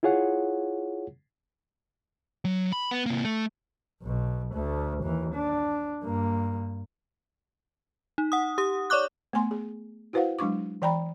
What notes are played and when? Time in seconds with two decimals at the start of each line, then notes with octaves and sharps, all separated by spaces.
0.03 E4 F4 G#4 C#5 F#5
2.45 F#3
2.72 B5
2.91 B3
3.06 C3 A#3
3.25 A3
4.02 B1 B2
4.54 D2 A3
5.03 D#2 E3
5.34 D4
6.03 G2 A#3
8.18 D#4
8.32 F#5 D#6
8.58 G4 D#6
8.90 C#5 D5 C#6 D6 F#6
9.33 A3 B3 G#5 C6
9.51 G#4
10.13 E4 F#4 B4 C5 F5 F#5
10.39 F#3 G#3 D4 C#6 D6
10.82 E3 D5 G5 A#5 B5